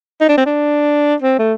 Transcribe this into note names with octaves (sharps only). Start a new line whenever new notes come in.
D#4
D4
C4
D4
C4
A3